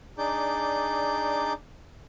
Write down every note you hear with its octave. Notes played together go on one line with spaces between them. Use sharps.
D4 D#4 G#4 D5 D6 G6